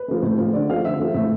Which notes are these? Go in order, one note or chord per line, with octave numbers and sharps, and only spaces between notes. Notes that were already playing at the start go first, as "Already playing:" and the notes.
Already playing: B4
F3 A3
A2
F3 A3
D3 D5
F3 A3 F5
D3 E5
F3 A3
A2 E5